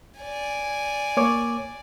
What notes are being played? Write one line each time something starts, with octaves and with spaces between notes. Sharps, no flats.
D5 G#5
A#3 C#5 D6